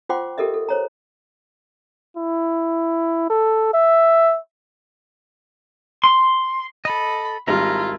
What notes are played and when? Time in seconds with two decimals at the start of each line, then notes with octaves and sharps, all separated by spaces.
0.09 F4 C5 F#5 G5 C6 D6
0.38 G4 A4 A#4 D#5 E5
0.54 A4
0.69 C5 C#5 A#5
2.17 E4
3.30 A4
3.74 E5
6.04 C6
6.85 A4 D#5 B5
7.48 G#1 G3 E4 F4 A#4 A#5